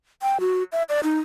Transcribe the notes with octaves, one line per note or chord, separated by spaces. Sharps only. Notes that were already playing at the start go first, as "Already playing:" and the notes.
G5
F#4
E5
D5
D#4